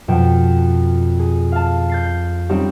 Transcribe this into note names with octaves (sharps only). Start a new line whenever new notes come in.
F2 B2 G5
G#4
F5 A5
G6 A6 C7
G3 C4 C#4 D#4 G4